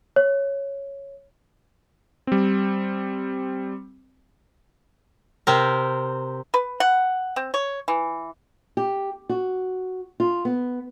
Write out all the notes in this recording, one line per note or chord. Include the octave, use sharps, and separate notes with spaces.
C#5
G3 C4
C3 C4 A#4
B4
F#5
C4
C#5
E3
G4
F#4
F4
B3